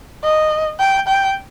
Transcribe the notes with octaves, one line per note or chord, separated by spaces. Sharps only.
D#5
G5
G5